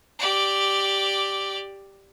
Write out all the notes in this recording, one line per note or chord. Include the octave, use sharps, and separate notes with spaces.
G4 D5